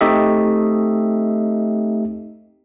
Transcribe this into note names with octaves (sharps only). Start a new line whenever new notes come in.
A3 C4 D#4 G4 D#5 E5